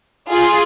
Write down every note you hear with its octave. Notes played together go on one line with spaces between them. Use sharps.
F4 G#4